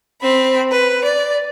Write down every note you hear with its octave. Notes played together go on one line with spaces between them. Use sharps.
C4 B5
B4
D5